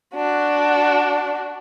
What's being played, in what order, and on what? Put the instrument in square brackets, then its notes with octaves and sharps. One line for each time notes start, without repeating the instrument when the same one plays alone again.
[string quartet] D4 F#4